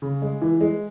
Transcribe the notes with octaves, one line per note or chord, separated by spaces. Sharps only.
C#3
G#3
E3
G#3